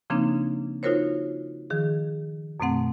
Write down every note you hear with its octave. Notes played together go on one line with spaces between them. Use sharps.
C#3 F3 A#3 C4 D4 D#4
D#4 F4 F#4 A#4 C5 C#5
D#3 F3 G#4
F#2 B2 A3 C4 F#5